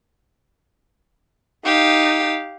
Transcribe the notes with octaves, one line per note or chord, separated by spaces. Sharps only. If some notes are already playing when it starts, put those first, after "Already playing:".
D#4 G4 F5